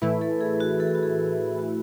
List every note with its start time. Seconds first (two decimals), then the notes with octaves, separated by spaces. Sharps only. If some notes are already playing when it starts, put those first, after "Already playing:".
0.02 A2 E3 A3 E4 B4
0.21 A4
0.41 G#4
0.60 F#4
0.80 A4
0.87 G#4
0.95 F#4
1.03 G#4
1.59 F#4